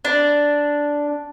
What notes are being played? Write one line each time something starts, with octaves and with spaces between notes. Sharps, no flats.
D4